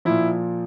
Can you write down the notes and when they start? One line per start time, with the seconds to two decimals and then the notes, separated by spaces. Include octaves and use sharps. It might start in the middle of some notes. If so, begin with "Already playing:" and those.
0.05 A#2 F3 E4